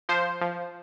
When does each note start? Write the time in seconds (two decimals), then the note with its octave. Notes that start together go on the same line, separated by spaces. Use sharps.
0.09 F3 C5 C6
0.41 F3